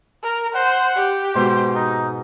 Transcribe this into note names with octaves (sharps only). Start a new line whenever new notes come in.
A#4
C5 F#5
G4
G#2 B2 C5
D#4